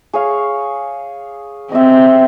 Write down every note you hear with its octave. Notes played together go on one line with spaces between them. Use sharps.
G#4 C#5 F5
C4 D#5 E5